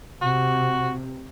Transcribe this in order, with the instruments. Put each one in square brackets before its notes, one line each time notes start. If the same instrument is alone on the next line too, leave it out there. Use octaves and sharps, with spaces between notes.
[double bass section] C3 [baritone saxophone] F#4